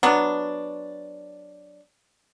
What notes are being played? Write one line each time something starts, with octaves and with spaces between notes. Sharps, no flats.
F#3 B3 D4